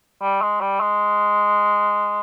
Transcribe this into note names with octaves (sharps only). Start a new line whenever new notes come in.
G3
G#3
G3
G#3